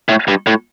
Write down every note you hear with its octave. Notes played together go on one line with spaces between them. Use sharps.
A2
G2
A2